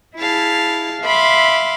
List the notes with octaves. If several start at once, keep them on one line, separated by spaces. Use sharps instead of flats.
E4 G#4 F5 A5
E5 F5 B5 C6 D6